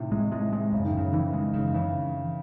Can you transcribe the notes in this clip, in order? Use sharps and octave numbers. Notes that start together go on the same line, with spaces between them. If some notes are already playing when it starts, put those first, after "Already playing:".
Already playing: A2 C3 D#3
G#3
A2 G#3
G#3
F#2 C#3
D#3
F#2 C#3
D#3 E3
G#3
F#2 C#3
C#3 E3